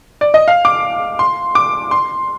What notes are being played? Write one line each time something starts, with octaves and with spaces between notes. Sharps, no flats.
D5
D#5
F5
D6
C6
D6
C6